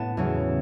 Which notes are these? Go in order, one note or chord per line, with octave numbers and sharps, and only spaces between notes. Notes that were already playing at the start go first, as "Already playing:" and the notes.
Already playing: A2 B3 A5
E2 C#3 F#3